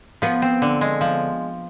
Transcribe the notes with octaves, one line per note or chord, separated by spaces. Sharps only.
F3 B3
C4
D3
G#3
F3